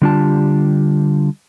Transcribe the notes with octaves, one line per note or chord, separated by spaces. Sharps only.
D3 G3 D4 F4 G4 A5